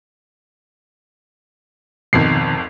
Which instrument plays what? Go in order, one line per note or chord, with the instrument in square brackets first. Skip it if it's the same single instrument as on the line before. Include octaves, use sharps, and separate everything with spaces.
[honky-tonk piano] G#1 F2 C7 [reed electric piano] B2 D#3